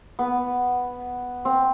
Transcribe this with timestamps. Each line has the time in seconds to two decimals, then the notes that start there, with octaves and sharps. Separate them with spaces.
0.19 B3
1.45 C4